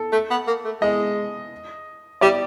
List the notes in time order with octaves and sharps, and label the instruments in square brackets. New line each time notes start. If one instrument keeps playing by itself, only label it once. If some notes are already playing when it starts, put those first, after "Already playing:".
Already playing: [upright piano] A4
[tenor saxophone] A3
B3
A#3
A3
[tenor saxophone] G#3 [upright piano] D#5
[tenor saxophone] G3 [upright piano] D5